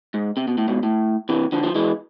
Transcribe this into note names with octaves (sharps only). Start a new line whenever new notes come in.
G#2
C3
B2
A2
G#2 B2
A2
C3 E3
D3 F3
F3
E3 G#3